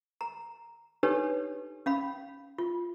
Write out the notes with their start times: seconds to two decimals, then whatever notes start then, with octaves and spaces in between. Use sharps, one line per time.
0.21 A#5
1.03 D4 D#4 G4 A4 B4 C#5
1.86 C#4 F5 B5
2.58 F4